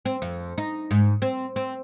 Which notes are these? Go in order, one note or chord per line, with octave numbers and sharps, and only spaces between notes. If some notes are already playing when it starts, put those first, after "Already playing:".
C4
F2
D#4
G#2
C4
C4